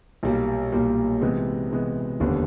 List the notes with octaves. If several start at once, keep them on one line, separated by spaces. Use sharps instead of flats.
B1 A#2 G3 A#3
B1 A#2 G3 A#3
C3 E3 G#3 B3
C3 E3 G#3 B3
F1 D#2 D3 G3 B3